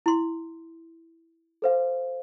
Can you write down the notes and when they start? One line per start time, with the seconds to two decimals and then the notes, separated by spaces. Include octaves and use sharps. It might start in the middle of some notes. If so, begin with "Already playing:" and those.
0.06 E4 C6
1.62 A4 C5 F5